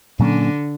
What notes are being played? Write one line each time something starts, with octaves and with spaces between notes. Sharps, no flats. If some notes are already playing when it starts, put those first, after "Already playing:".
A#2 D3 F#3 A#3 C#4